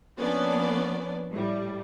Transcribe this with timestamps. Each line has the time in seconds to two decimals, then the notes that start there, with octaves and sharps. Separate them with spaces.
0.18 F3 A#3 B3 C#4 D4 D5
1.30 A2 G3